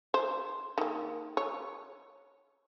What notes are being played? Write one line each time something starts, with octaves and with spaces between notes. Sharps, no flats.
C5
D#3 A#3
C#5